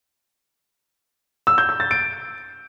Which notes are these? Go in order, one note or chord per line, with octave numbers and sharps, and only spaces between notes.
E6
G6
G6
A6
D7